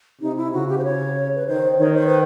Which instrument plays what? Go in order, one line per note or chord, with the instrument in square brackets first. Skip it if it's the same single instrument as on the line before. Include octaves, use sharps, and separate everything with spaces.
[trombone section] C3 [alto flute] D#4
[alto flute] E4
[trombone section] C#3 [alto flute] F#4
[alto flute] G4
C5
C#5
B4
[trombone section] D#3 [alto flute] C5
[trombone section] D#3 [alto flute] C#5
[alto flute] C5
B4